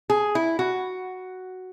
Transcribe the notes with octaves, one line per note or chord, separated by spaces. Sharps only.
G#4
E4
F#4